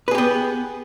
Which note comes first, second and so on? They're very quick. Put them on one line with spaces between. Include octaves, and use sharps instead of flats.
B4 G#4 G4 B3